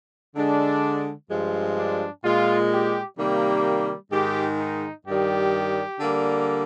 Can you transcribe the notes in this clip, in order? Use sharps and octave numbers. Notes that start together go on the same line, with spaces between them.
D3 G#3 D4
G2 F3 G#3
D4
A#2 G#3 F4
G4
C3 D#3 G3 A#3
G#2 D#3 G#3 G4
D#4
G2 D#3 G3 G4
D3 G3 A#3